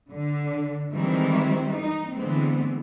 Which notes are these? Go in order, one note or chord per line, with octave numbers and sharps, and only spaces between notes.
D3
D#3 E3 G3 G#3 C4
D#4
D3 E3 G#3 A3 B3 C4